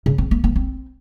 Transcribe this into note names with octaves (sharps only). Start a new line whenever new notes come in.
C#3
C4
A#3
A#3
C4